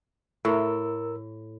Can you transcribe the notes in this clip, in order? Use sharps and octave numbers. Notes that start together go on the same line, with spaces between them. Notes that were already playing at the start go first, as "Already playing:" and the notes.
A2 A#4 E6